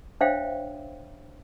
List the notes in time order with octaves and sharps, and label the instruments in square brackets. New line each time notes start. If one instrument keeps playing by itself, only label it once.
[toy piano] D4 C5 C#5 E5 F5 G5